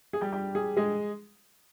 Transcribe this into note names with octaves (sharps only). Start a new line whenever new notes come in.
G#4
G3 G4
G3 G4
G#4
G#3 G#4